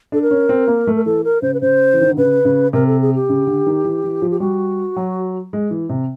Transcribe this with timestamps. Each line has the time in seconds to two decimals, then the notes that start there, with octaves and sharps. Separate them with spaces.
0.12 D4 A4
0.22 A#4
0.31 C#4
0.49 C4
0.68 A#3
0.87 A3
0.95 A#4
1.05 E3 A4
1.24 A#4
1.42 C#3 C5
1.54 B4
1.61 C#3 C5
1.94 E3
2.01 D#3
2.09 D3
2.17 C#3 B4
2.45 C#3
2.73 C3 A#4
2.87 A4
3.01 G#4
3.15 G4
3.29 C#3
3.47 D3
3.67 D#3
3.84 E3
4.04 E3
4.22 F3
4.31 G4
4.40 G3 F#4
4.96 F#3
5.53 G#3
5.71 E3
5.90 C3